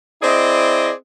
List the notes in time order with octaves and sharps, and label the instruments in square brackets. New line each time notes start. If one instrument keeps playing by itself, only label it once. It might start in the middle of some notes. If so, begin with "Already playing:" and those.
[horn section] C4 E4 G#4 D5 D#5